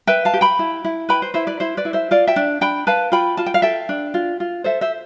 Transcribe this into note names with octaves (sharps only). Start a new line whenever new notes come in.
B4 E5 G5
F5 A5
G4
G5 B5
E4
E4
B4 G5 B5
C5
E4 C5 E5
B4 D5
E4 C5
B4 D5
E4
C5 E5
F4 D5 F5
E5 G5
D4
D4 G5 B5
B4 F5 A5
F4 G5 B5
F4 A5
G5
F5
A4 E5 G5
D4
F4
F4
A4 C5 E5
C5 E5